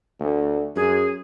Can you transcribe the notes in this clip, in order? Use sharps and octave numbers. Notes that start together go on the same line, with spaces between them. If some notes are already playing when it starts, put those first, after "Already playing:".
D2
F#2 G#4